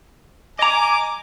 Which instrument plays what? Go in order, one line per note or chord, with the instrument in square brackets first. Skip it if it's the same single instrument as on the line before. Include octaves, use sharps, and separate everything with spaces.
[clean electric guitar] D#5 A#5 [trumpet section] G#5 D6